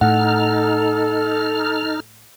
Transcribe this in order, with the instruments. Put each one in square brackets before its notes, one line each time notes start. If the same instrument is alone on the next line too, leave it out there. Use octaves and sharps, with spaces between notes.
[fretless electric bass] A2 [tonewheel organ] D#4 F6 [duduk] A4 [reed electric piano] F#5